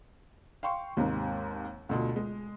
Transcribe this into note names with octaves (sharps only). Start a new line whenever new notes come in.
F5 G5 C6 C#6
D#2 G#2 C3
D2 B2 F4
G#3